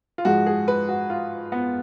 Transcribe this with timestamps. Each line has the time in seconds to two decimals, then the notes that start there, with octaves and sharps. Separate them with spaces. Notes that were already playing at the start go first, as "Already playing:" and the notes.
0.18 F4
0.25 G#2 F3 G#3 F#4
0.46 G#4
0.68 B4
0.89 F#4
1.10 F4
1.52 B3